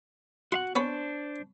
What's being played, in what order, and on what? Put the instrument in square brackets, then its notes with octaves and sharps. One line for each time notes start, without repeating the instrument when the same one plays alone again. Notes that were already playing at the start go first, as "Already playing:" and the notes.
[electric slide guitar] F#4 F5 F#5 [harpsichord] C6
[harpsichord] B3 C#4 B4 [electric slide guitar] D4 C5